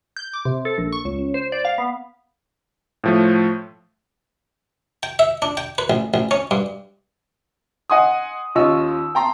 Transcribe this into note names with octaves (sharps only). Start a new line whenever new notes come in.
G6
D6
C3
A4
A#1
C#6
C#2
C#2
C5
D5
F5
B3
A2 F3 A3
G5
E5
D4
G5
B4
A1
A1
C#4
G2
D#5 F#5 G#5 C6 D#6
D#2 C#4 F4 D#5 C#6 E6
G5 A5 A#5 C6